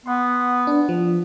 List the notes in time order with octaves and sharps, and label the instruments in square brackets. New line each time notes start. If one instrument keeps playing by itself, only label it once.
[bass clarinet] B3 [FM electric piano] F#5 C6
[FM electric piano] D4 B4
F3